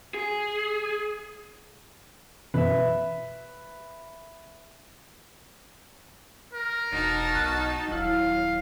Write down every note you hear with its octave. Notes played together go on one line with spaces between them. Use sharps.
G#4
F#2 B2 E3 B4 E5
A#4
E1 D#4 F#4 A5
B1 F6 F#6
D#1 F#3 E4 F5